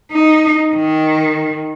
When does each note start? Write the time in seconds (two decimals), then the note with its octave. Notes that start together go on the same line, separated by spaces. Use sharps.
0.12 D#4
0.75 D#3